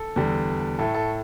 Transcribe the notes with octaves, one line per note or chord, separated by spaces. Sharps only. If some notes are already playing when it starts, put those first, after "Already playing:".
Already playing: A4
E2 D3 G3
A2 A3 A4
A4